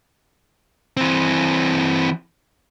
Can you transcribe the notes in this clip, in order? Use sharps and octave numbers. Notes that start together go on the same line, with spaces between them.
E3 C4